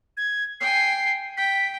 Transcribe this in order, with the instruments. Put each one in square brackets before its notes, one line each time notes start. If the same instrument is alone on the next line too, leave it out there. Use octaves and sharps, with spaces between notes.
[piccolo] G#6
[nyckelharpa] G5 G#5 [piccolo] C7
[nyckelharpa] G5 [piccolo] B6